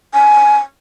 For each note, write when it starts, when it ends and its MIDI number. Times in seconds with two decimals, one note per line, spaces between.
0.14 0.58 80